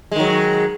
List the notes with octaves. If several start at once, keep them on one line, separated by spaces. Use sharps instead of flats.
D#3 F#3 G#3